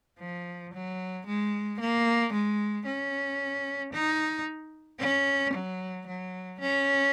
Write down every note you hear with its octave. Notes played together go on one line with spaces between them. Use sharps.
F3
F#3
G#3
A#3
G#3
C#4
D#4
C#4
F#3
F#3
C#4